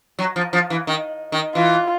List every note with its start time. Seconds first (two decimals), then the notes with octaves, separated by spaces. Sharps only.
0.19 F#3
0.36 F3
0.53 F3
0.70 E3
0.87 D#3
1.32 D#3
1.55 E3 F4